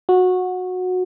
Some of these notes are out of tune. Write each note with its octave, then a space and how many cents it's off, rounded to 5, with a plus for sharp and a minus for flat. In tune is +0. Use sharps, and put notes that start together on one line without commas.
F#4 -15